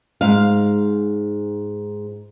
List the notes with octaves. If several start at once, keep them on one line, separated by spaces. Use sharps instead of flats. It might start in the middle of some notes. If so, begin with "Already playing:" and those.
G#2 F5